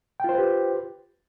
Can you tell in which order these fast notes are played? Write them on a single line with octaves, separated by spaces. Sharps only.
G5 F4 C5 B4 G4